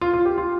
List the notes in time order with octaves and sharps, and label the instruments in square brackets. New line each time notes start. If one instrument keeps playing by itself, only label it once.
[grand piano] F4
F4
G4
F4